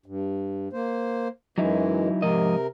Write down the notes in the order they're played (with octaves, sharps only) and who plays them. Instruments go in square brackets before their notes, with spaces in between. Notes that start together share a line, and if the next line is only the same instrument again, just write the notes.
[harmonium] G2
A#3 C5
[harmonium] F#2 E3 G#3 [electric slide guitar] F#3 D#4 E4
[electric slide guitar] G#2 F3 D#5 [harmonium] C3 A#4